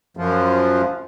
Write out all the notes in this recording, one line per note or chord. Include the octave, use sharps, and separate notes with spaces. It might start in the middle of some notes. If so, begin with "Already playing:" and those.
F#2 F3